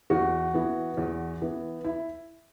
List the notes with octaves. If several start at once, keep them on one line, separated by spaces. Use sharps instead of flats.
E2 F#4
E3 B3
E2
E3 B3
E4